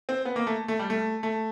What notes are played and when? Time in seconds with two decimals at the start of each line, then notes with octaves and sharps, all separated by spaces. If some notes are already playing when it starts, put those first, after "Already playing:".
0.09 C4
0.25 B3
0.36 A#3
0.47 A3
0.68 A3
0.79 G3
0.90 A3
1.23 A3